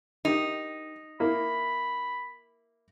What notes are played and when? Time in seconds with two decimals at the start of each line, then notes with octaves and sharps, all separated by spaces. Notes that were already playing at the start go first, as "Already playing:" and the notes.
0.25 D#3 D#4 G4
1.20 A#3 E4 A#4 B5